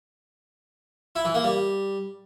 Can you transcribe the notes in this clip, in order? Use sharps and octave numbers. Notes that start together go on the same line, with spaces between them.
E4
E3
A#3
G3